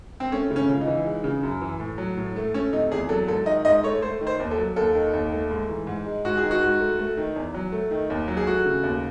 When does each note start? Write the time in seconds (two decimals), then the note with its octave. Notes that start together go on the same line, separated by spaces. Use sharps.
0.20 C4
0.32 A3 C#4
0.51 C#3
0.56 C#4
0.69 C#2
0.81 D#4
0.87 E3
1.05 G#3
1.24 C#3
1.43 F#2
1.61 E3
1.80 A2
1.98 F#3
2.17 A2
2.36 A3
2.54 A3 C#4
2.73 C3 D#4
2.91 E2 G#4
3.09 F#3 A4
3.28 G#2 A4
3.46 D#3 D#5
3.65 G#2 D#5
3.83 A3 C#5
4.02 A3 C5
4.21 D#3
4.27 C5
4.40 D#2
4.51 A4
4.58 F#3
4.76 D#2 A4
4.95 D#3
5.13 D#2
5.32 A3
5.51 G#2
5.69 E3
5.87 G#2
6.06 G#3
6.25 G#2 F#4
6.37 G#4
6.43 D#3
6.51 F#4
6.62 G#2
6.80 A3
6.99 A3
7.17 D#3
7.36 E2
7.54 F#3
7.72 A3
7.91 D#3
8.10 D#2
8.28 F#3
8.37 G#4
8.47 A3 F#4
8.66 C#3
8.84 D#2